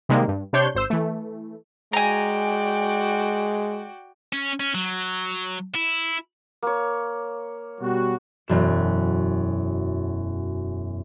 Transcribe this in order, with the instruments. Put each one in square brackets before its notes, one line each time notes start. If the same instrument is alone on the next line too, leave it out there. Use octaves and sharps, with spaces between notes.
[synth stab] C3 D#3 G3 G#3 A#3
G2
C3 D4 C#5 C6 G6
G#1 C5 E6
E3 A3
[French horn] G#3 [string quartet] F#4 D5 G5 [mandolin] G#5 A#5
[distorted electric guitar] C#4
C#4
F#3
E4
[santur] A#3 C#5
[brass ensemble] B2 G3 F#4
[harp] E1 F#2 E7